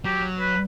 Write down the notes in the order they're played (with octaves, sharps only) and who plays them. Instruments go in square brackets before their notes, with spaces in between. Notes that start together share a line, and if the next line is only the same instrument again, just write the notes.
[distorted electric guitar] F#3 [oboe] G4
[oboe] B4